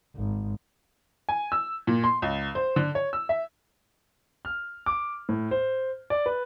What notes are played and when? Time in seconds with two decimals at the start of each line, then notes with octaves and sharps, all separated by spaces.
0.15 G#1
1.29 G#5
1.52 E6
1.87 A#2
2.04 C6
2.22 C#2
2.55 C5
2.76 D3
2.95 C#5
3.13 E6
3.29 E5
4.45 F6
4.86 D6
5.29 A2
5.51 C5
6.10 D5
6.26 B4